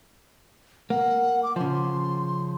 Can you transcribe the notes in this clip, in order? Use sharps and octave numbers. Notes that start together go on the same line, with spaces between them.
A#3 F#5
D6
C#3 F3 C6